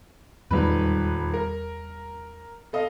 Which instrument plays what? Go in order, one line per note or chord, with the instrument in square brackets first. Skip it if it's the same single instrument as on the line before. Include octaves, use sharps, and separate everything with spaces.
[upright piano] D#1 G#2 B4 [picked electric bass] E2 G3
[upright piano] A#4
A4 D#5 F5